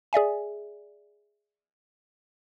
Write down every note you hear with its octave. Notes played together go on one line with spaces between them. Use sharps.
G#4 D5 E5 G#5